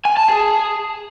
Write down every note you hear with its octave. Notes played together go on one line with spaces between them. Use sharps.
G#5
A5
G#4